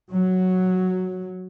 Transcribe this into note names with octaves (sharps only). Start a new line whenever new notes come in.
F#3